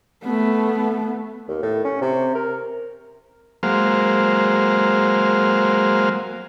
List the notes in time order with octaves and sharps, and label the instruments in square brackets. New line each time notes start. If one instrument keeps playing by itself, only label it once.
[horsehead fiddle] A3 B3
[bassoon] D#2
A2
C#4
C3
A#4
[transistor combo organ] F#3 G#3 A#3 C5 F5